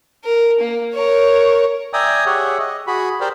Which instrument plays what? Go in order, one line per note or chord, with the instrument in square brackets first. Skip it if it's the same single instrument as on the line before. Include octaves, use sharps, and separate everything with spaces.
[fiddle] A#4
A#3
A#4 C#5
[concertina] D5 E5 G5 G#5 A#5 D#6
G4 G#4 C#5 E5 F#5
D#5
F#4 G#4 B5
G4 A#4 C5 D5 G5